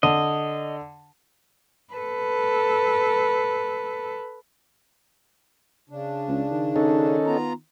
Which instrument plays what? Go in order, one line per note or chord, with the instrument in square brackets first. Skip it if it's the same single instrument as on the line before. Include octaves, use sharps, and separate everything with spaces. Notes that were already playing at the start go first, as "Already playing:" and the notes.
[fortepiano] D3 [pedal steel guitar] D#5
[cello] A4 B4
[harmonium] C#3 D4
[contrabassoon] C#2
D#3
[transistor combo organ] C#4 D#4 A4
[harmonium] B3 F4 A#5